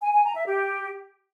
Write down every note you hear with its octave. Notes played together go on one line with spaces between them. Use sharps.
G#5
G#5
A#5
E5
G4